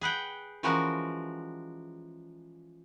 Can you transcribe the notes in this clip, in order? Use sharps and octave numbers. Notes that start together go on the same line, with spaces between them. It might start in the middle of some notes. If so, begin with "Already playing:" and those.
G#4 B4 F#5 G5
E3 F3 G#3 C#4 F#4 A#4